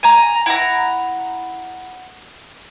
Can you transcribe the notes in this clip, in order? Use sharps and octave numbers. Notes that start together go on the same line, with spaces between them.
G#5 A#5
E4 F#5 A#5